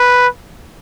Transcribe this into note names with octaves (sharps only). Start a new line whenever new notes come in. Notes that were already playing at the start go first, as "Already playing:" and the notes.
Already playing: B4